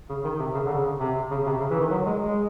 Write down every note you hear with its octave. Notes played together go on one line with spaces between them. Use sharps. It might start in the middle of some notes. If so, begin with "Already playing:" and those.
C#3
D#3
C3
C#3
D3
C#3
C3
C#3
C3
C#3
E3
D#3
F#3
G#3
G#3